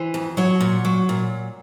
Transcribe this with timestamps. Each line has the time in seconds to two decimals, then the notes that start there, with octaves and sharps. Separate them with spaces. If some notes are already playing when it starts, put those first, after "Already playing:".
Already playing: E3 C5
0.14 F2
0.37 F#3 C#5
0.61 A#2
0.85 F#3
1.09 A#2